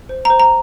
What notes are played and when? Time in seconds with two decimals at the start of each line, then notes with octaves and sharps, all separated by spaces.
0.09 C5
0.25 A#5
0.30 C5
0.40 A#5